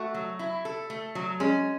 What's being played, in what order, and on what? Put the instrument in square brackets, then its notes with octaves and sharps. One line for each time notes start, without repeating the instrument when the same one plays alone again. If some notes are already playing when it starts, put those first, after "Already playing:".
Already playing: [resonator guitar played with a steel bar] A3 [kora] F#4
[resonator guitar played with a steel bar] F#3
E4
A4
A3
F#3
[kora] G#3 [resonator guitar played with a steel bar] C#4